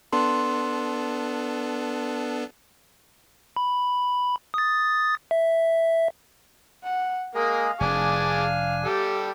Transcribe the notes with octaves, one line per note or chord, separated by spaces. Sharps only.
B3 D4 A4 C6
B5
D#6 A6
E5
F#5
G#3 A#3 G#4 A#4 D#5 F5
F1 D4 G#4 G#5 A5 D6
F5
G3 G4 A4